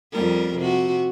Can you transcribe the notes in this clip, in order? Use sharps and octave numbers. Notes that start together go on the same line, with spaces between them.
F2 G3 A#4
C3 F#4